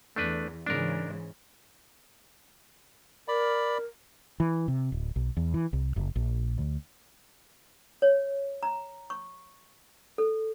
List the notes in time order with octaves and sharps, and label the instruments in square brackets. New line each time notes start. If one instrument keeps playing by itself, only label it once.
[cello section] E2 [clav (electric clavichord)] A3 D4 B4
[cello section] G#2 C#3 E3 [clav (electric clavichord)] D4 A#4
[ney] A#4 [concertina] D5 B5
[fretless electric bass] E3
C3
D1
B1
E2
E3
C2
F#1
A#1
D2
[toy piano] C#5
A#5
C#6
A4